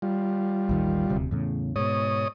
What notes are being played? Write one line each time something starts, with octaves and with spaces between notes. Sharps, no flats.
G3 F4
A1 D#2 D#3
D#1 D2 C3
E2 A2 C#3
G#2 B2 C#5 D#6